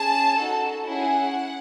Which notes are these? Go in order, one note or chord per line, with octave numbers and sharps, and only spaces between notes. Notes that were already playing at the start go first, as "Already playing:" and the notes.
Already playing: C#4 G#4 A5
D#4 F#4 A4
C#4 E4 G#4 F#5